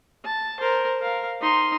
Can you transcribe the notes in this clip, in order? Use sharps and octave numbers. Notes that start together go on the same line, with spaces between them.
A5
A#4 C5
A#4 F5
D#4 C6